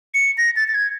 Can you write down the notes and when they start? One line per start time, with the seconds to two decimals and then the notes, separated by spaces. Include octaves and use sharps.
0.14 C#7
0.38 A#6
0.56 A6
0.68 A6
0.74 G#6